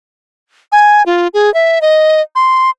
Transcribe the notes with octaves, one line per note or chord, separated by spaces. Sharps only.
G#5
F4
G#4
E5
D#5
C6